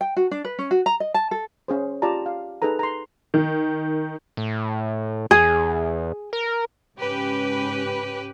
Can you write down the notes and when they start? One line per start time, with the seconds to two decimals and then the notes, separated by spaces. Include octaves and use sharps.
0.01 G5
0.16 F#4
0.31 D4
0.44 B4
0.59 C#4
0.71 F#4
0.86 A#5
1.00 D#5
1.14 A5
1.31 A4
1.68 C#4 G#4 C5
2.02 F4 G4 D5 A5 A#5
2.26 F5
2.62 D#4 G#4 A4 B4 A#5
2.79 A#5 C6
3.34 D#3
4.37 A2
5.31 E2 G#4
6.33 A#4
6.97 G#2 C#3 C#4 G4 B4